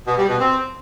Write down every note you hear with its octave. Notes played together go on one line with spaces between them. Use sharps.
B2
G3
B2
C4